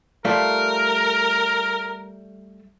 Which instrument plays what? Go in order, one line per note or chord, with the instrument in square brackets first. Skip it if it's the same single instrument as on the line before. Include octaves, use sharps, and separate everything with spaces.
[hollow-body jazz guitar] G3 A3 F4 [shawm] A#4